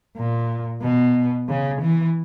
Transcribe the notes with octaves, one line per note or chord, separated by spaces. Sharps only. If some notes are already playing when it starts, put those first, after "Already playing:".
A#2
B2
C#3
E3